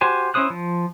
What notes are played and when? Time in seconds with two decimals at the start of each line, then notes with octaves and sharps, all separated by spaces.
0.01 F#4 G4 C5 G#5
0.34 C#4 E4 C5 D#6 F#6
0.50 F3